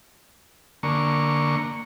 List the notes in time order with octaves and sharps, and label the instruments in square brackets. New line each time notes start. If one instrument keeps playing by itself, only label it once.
[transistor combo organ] D3 A#3 C#6